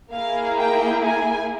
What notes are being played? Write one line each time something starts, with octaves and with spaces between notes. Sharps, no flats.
A#3 E4 G#4 F5
G5
G#5